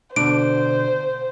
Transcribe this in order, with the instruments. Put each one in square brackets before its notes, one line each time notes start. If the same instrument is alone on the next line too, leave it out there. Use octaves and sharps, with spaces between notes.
[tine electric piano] B2 D3 [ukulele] D4 [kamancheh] C5 [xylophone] D7